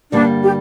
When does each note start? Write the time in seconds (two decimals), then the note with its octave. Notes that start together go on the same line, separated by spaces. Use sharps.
0.12 G2 D3 G3 A#3 D4
0.43 G4